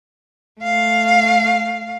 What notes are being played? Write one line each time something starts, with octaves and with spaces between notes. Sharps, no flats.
A3 F5